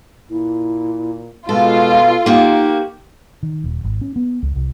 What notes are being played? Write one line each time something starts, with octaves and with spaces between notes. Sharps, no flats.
A#2 E4
B2 G#3 F4 A4
A#3 D#4 F#4 G4
D#3
D#1
G#1
C#4
B3
C#2
C2